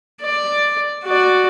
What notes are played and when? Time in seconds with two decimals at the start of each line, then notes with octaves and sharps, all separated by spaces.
0.21 D5
1.04 F#4 D5